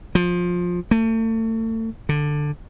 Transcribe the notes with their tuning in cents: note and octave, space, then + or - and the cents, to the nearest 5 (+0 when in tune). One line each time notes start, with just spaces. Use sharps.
F3 +20
A3 +35
D3 +10